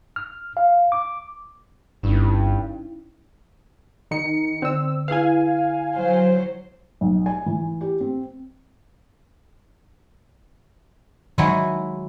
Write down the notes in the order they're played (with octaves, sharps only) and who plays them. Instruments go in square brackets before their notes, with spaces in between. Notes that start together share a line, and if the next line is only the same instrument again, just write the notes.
[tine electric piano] F6
F5
D6
[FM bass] G1 [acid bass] G2 [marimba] C#4 D#4 E4
[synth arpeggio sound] D#3 D#4 C#7
[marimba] D3 [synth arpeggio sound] C4 E6
[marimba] E4 G#4 B4 [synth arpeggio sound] F5 G#5
[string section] F#3 C5
[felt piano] B1
G#5
E3
G4
C4
[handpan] D#3 [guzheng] F#3 G#3 E4